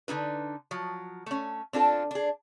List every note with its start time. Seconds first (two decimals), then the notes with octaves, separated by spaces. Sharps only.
0.08 D3 D#4 E4 B4
0.71 F3 F#3
1.26 A3 C#4
1.73 C4 D4 F4 A4
2.11 D4 G#4